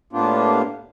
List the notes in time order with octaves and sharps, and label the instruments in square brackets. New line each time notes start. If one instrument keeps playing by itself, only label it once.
[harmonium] A2 A#3 B3 D4 F4 G4